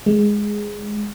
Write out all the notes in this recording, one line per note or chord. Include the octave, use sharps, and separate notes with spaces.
G#3